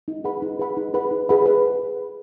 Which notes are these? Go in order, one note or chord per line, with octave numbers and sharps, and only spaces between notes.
D#4
G#4 B4 F#5 B5
D#4
G#4 B4 F#5 B5
D#4
G#4 B4 F#5 B5
D#4
G#4 B4 F#5 B5
B4